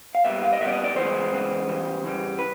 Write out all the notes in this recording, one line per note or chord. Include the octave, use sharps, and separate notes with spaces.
F5
A#2 G3 B3 E5
F5
D#5
A#2 G3 B3 E5
D5
D#5
D5
E2 C#3 E3 G#3 B3 C5
E2 C#3 E3 G#3 B3
E2 C#3 E3 G3
E2 C#3 E3 G3
B4